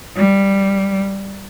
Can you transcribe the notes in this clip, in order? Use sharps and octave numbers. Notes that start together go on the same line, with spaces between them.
G3